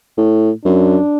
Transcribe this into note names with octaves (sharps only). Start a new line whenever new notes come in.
A2
F#2 D4